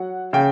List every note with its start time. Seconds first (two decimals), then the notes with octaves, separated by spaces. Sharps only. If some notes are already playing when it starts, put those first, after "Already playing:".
Already playing: F#3 F#5
0.33 C#3 G5